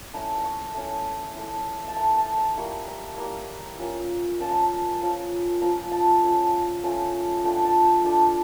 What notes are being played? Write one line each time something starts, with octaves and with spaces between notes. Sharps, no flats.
A3 C#4 E4 A#5
A#5
C#6
A3 C#4 E4
A3 E4
A5
A3 E4 A#5
A5
A#5
G3 A#3 E4 C#6
A#5
G3 A#3 E4 A#5
A#3 C#4 F4
A#3 C#4 F4 A5
A#5
A5
F3 C#4 F4
F3 C#4 F4 A#5
A5
A3 C#4 F4
A3 C#4 F4
A3 D4 F4 G5
A5
G5
A3 D4 F4 A5